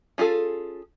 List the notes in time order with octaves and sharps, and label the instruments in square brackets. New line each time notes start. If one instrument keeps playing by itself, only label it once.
[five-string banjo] C#4 F4 G#4 A4